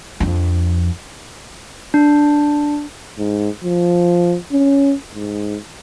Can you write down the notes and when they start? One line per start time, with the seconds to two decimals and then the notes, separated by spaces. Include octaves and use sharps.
0.20 F2 D4
1.94 D4
3.18 G#2
3.64 F3
4.52 C#4
5.14 G#2